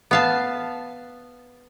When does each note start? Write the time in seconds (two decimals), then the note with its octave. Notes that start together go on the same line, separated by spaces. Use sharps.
0.11 B3 F5 A5